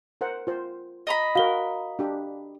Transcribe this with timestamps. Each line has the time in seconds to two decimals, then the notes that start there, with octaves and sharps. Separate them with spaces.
0.21 A#4 C5 F#5
0.47 F4 C5
1.07 D#5 A#5 B5
1.35 F#4 A#4 F5 G7
1.99 D4 G4